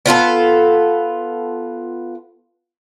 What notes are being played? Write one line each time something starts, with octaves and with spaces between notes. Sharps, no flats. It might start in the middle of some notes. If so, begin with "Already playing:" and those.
B3 F4 G4 A4